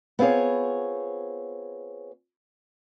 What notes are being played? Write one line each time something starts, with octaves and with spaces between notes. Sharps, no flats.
B3 C4 F4 G#4 C#5